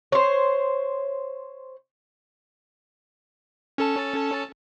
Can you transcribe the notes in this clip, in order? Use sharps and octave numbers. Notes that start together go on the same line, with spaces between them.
C5 C#5
C#4 A4 A5